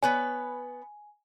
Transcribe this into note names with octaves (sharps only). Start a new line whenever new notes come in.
B3 B4 C#5 G#5